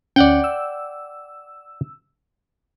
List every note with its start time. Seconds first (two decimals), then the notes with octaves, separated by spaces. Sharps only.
0.16 D2 C#4 D5 F#5 G5
0.44 E6